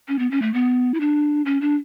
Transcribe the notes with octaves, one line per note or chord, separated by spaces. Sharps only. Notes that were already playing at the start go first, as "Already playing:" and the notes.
C#4
B3
C#4
A3
B3
E4
D4
C#4
D4